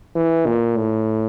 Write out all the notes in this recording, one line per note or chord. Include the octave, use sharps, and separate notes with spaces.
E3
A#2
A2